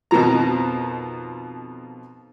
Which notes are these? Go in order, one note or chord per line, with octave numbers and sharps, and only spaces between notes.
F2 B2 D#3 F3 A#5